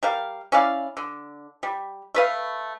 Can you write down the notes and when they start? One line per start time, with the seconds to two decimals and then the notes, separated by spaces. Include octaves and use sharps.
0.03 G3 A#4 F5
0.52 C#4 E4 D5 F5
0.97 D3
1.63 G3
2.15 A3 B4 F5